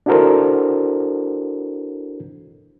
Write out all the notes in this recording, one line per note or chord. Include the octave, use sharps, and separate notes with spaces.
D4 E4 F#4 A4 A#4 C5